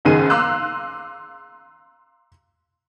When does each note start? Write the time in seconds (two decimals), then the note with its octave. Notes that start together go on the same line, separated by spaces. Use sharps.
0.05 F#1 F#2 D#3 D#4 G#4 D#7
0.30 F5 A#5 C6 D6 E6 F#6